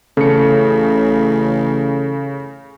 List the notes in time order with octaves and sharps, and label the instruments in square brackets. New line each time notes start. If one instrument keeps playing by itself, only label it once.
[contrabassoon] A1 [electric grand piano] C#3 C#7 [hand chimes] A4